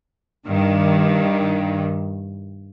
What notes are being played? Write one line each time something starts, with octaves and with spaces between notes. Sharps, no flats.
G2 D#3